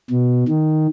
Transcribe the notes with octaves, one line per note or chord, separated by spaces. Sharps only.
B2
D#3